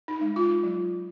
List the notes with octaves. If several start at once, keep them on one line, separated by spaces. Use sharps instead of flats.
D#4
G#3
F4
F#3